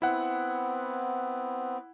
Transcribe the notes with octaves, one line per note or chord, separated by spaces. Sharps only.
B3 C4 E4 F#5